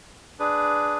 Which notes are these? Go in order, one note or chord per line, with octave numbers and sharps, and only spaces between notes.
D4 G#4 B4